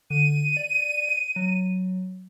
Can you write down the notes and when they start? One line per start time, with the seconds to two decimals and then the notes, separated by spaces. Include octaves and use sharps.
0.10 D3 D#7
0.57 D5
1.09 D7
1.36 F#3